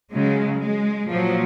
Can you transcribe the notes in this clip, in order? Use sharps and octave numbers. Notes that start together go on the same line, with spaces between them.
C#3 F#3 G#3
G#3
A#2 F3 F#3